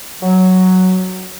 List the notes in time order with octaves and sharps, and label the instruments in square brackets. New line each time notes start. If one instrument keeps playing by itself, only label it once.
[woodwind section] F#3